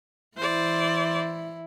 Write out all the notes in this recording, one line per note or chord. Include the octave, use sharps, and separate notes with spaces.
E3 E4 C5 D5